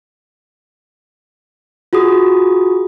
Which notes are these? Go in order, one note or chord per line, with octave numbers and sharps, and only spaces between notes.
F4 F#4 G#4 D#6